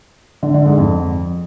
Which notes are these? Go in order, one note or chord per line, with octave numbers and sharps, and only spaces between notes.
D3
D3
G#2
F2